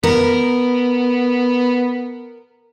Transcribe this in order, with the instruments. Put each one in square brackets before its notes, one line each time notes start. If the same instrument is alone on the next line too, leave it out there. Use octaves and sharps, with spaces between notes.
[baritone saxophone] B3 [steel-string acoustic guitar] A#4